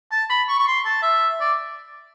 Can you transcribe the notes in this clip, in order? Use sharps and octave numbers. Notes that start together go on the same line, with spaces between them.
A5
B5
C#6
C#6
C6
A5
E5
D5